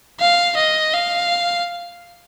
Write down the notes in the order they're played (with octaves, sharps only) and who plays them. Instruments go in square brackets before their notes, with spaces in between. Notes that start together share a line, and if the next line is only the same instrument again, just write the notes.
[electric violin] F5
D#5
F5